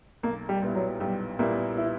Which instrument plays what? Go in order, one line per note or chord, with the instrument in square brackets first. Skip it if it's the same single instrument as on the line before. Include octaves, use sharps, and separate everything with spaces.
[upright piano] B1 [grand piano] A#3
[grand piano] G3
[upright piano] A#2 G3 B3 E4
[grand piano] F#3
[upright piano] B1 [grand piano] G3
[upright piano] A#2 G3 B3 E4 [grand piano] A#3
[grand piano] E4